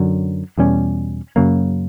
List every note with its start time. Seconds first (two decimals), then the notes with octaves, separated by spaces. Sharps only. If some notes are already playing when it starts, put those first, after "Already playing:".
Already playing: F#2 D3 F#3
0.58 E2 B2 G3 C#4
1.36 F#2 C#3 F#3 A#3